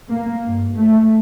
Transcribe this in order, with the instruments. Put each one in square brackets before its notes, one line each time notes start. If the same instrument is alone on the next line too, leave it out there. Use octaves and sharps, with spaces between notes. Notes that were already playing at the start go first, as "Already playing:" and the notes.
[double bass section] A#3
G2
A3